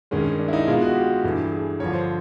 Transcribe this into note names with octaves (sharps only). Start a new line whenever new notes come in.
G2 D#3 G#3 C#4
D4
E4
D#4
B2 G#3 F4
F#4
G4
G2 E3 A3
G#4
G2 D3 F3 C#5
C5